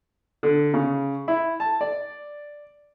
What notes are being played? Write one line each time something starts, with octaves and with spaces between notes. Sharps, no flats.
D3
C#3
E4
A5
D5